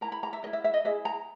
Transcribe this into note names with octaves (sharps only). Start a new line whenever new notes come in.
E4 A#4 A#5
B5
A#5
E5
E4 A#4 D#5
E5
E5
D#5
E4 G#4 B4 E5
A#5